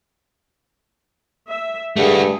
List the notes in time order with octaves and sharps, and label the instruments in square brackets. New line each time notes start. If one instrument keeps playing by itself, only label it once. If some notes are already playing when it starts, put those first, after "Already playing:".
[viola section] E5
[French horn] G2 [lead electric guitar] A3 F#4 [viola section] G#4